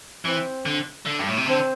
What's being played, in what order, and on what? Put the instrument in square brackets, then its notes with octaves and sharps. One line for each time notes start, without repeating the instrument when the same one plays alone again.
[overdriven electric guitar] E3 [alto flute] C4
[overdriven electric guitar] D3
D3
G2
A2
C3
[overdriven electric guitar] D3 [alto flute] C4